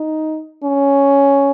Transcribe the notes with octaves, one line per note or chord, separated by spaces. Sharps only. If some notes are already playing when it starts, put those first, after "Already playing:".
Already playing: D#4
C#4